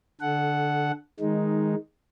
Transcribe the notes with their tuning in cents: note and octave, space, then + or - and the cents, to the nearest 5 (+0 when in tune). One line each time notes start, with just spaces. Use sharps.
D3 +0 A4 -20 F#5 +0
D#3 +15 G#3 +0 D#4 +0